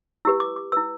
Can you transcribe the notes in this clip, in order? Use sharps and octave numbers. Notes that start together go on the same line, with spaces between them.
E4 G4 B4 E6
D6
D6
E4 B4 E6